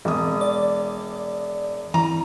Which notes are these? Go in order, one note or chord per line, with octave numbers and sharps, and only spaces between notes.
E1 D#6
D5
E3 A#5